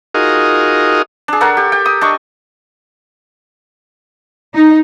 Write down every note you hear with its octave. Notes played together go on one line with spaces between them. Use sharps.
D#4 F4 F#4 G#4 A#4 D#5
D4 G#4
A4 A#4 C#5 F#5
G4
G5
D#6
D4 D#5 C#6
D#4